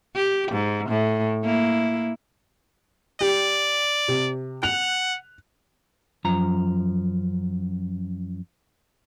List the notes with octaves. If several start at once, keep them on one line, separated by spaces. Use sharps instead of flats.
G4
G#2
A2
A#3 E4
G4 D5
C3
F#5 F#6 F7
F#2 F3 A#5